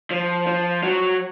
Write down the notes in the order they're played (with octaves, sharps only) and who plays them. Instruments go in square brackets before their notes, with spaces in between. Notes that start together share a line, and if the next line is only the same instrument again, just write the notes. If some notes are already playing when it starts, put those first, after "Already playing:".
[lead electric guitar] F3
F3
F#3